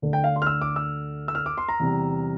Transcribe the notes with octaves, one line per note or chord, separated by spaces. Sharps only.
D2 D3 A3
G5
F5
C6
F6
E6
D6
E6
E6
F6
D6
C6
A#5
E2 C3 G3